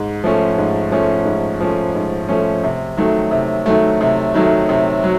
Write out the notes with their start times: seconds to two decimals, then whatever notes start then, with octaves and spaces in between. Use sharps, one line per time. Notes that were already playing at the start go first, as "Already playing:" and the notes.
Already playing: G#2
0.24 F3 A3 C#4
0.58 G#2
0.91 F3 A3 C#4
1.26 G#2
1.60 F3 A3 C#4
1.95 G#2
2.29 F3 A3 C#4
2.63 C3
2.97 D#3 F#3 A3
3.31 C3
3.66 D#3 F#3 A3
4.01 C3
4.34 D#3 F#3 A3
4.69 C3
5.03 F#3